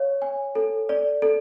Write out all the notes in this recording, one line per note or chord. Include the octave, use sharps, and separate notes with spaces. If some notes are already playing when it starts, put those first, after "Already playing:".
Already playing: C#5 F5
G#5
A4
D5
A4